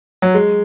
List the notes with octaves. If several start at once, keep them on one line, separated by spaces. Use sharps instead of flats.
F#3
G#3